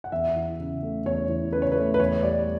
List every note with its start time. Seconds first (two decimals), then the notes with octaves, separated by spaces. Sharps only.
0.04 F#5
0.12 E2 E5
0.36 E3
0.59 C#3
0.83 A3
1.06 E2 C#5
1.29 E3
1.53 C#3 B4
1.62 C#5
1.72 A3 B4
1.94 B4
2.00 E2 C#5
2.23 G3 D5